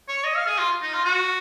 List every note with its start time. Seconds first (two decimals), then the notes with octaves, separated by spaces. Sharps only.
0.08 C#5
0.24 D#5
0.36 F5
0.47 G#4
0.59 F4
0.82 D#4
0.93 F4
1.05 F#4